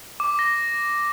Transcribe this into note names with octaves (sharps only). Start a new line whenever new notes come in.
D6
A#6